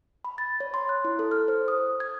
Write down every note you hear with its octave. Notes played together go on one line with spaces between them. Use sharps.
B5
A6
C#5
C6
F#6
E4
A4
F6
C5
D#6
G#6